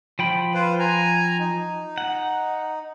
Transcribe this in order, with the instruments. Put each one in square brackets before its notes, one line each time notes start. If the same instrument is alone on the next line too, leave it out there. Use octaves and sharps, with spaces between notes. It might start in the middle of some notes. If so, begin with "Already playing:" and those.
[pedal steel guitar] F3 G5 B5
[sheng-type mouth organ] F4 B4 C5
G#5 A#5
D#4
[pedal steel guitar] F#5